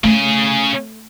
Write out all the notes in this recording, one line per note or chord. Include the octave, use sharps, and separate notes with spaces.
C#3 A3 G#4